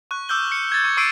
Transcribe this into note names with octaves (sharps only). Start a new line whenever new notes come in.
C#6 F#6
D6 E6 F6 G6 G7
C#7
G#6 A6
C#6
C#6 D6 E6 C7 D7 D#7